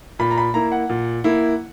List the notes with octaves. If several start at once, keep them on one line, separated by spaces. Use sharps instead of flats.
A#2 B5
A#5
B5
A#3 E4 A#5
F#5
A#2
A#3 E4